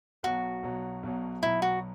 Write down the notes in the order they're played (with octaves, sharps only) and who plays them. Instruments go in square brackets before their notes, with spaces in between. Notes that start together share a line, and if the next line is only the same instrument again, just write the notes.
[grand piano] B1 B2 F#3 [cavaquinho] F#4
[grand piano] B1 B2 F#3
B1 B2 F#3
[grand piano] B1 B2 F#3 [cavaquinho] E4
[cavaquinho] F#4